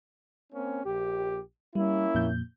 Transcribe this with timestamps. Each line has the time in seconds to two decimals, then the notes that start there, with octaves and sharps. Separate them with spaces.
0.53 A#3 C4 C#4
0.86 A#1 G4
1.75 G3 A#3 C#4 E4
2.14 F2 A#2 G6